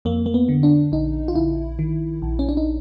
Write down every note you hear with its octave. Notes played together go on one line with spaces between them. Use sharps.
F2 A#3
A#3
B3
D3
D4
A#1 D#4
F4
A#1 E4
D#3
A#1
C#4
D4
D#4